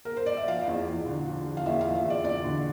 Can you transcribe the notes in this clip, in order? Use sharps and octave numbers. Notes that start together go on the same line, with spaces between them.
A#4
C5
D5
E5
F3 F5
E2
E2
D3
F3
F3
F5
E2 E5
F5
F3
E5
E2 D5
E2 D5
D3